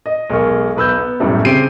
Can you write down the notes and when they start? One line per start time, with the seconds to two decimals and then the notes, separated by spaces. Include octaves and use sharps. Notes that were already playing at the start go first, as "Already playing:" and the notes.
0.06 D#5
0.30 B1 G#3 G#4 A#4 C#6
0.77 B1 B4 E6 G6
0.98 B3
1.20 B1 F#2 A2 G3 A3
1.45 C#3 C4 G4 C7 D7 D#7